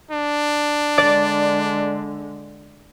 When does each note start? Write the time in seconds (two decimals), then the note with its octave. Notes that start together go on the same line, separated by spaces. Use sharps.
0.11 D4
0.98 D3 G#3 D5